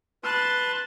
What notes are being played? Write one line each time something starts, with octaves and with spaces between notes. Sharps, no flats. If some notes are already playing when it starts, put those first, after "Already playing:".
B4 A5 C6 F#6